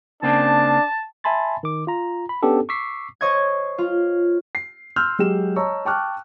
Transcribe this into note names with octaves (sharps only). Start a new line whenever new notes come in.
C#3 A#3 C4 D4 A5
E5 G#5 A5 B5 C6 A6
D#3 D6
F4 A#5
B5
B3 C#4 D4 G4 A4
C#6 D6 E6 B6 C7
C5 C#5 D#5 C#6 G#6
F4
C7
C6 E6 F6 G6
F#3 G#3 G4 E7
C#5 D#5 A5 A#5 C#6 E6
G5 A5 C#6 D6 F6 F#6